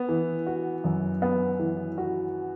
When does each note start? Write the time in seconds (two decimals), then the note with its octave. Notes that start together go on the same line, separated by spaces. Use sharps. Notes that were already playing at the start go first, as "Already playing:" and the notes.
Already playing: B3
0.09 E3
0.47 F#4
0.84 F#2
1.22 B3
1.59 E3
1.98 F#4